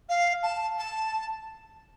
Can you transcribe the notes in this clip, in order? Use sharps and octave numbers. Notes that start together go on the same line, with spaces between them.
F5
A5
A5